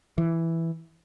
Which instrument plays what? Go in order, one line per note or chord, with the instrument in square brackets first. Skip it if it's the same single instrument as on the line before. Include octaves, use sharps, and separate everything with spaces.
[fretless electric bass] E3